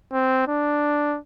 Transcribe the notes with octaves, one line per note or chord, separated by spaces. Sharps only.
C4
D4